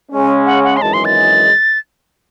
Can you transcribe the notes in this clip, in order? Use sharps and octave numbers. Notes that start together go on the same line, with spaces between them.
C#3 G#3 C#4
F#5
F#5
C6
G#1 F#2 E3 G#3 A5
C6
A6